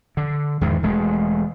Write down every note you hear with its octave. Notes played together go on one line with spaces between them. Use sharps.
D3
E2 G#2 D#3 E3
E1 G#3 A3